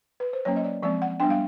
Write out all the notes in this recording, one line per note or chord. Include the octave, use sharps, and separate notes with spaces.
B4
C5
F#3 A#3 C#4 C#5
D#5
D5
F3 G#3 C4 D5
F#5
G3 B3 D4 G5
F5